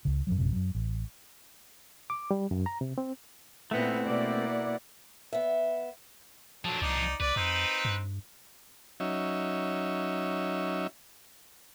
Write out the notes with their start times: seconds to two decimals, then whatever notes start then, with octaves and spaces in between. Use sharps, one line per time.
0.05 C#2 C#3
0.27 F#2 A2 F3 F#3
0.38 A#1 F#2 C3
0.52 F#2 F#3
0.75 A1
2.10 D6
2.31 G3
2.51 F#2
2.66 A#5
2.81 C3
2.98 C4
3.71 A#2 A3 B3 C4 E4 F#5
4.06 B2 A#3 D5
5.33 B3 E5
6.65 F3 F#3 D4 A4
6.82 C2 D#4 D5
7.20 C2 B4 D5
7.36 F2 C4 D#4
7.85 G2
9.00 F#3 C#4 D#4 E5